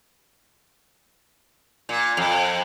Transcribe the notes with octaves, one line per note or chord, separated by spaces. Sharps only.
A#2
F2